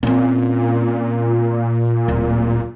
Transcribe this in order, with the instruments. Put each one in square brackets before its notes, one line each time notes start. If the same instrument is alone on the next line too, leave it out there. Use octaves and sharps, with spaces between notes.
[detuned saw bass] A#2 [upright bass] C4 C#4
[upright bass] D1